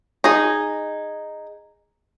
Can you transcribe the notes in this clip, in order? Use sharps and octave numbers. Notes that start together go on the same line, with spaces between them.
D#4 G#4